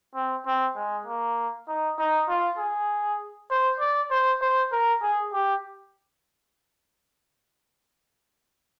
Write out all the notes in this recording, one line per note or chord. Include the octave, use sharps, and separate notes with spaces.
C4
C4
G#3
A#3
D#4
D#4
F4
G#4
C5
D5
C5
C5
A#4
G#4
G4